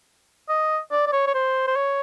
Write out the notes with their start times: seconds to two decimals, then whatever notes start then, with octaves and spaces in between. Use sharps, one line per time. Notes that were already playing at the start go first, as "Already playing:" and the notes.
0.49 D#5
0.92 D5
1.07 D5
1.13 C#5
1.27 C#5
1.34 C5
1.67 C5
1.76 C#5